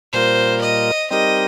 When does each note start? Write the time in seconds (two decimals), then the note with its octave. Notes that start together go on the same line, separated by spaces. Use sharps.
0.13 A#2 G3 A#3 F4 A#4 C5
0.61 D#5
1.10 G3 C4 D#4 G4 A#4 D#5